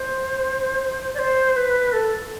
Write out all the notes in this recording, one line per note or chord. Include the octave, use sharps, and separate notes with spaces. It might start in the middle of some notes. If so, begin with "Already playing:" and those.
Already playing: C5
D5
C5
C5
B4
A4